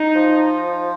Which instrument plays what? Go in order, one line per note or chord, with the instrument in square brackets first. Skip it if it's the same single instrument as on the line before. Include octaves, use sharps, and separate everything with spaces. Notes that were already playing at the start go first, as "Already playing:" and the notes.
Already playing: [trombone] D#4
[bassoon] F3